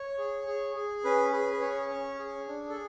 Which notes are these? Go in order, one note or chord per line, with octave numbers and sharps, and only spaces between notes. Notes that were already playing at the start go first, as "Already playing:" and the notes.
Already playing: C#5
G#4
G#4
G#4
C#4 B4
G#4 B4
B4
C#4 C#5
C#4
G#4
D4
A4